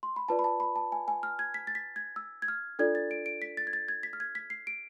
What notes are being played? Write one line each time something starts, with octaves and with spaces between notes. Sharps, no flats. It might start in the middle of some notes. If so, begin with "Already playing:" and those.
C6
B5
F4 B4 D5 A5
B5
A5
B5
A5
G#5
G#5
F6
G#6
B6
A6
B6
G#6
E6
G#6
F6
D4 F4 A4 D5 G#6
A6
D7
D7
B6
A6
G#6
A6
G#6
B6
F6
G#6
B6
C7
D7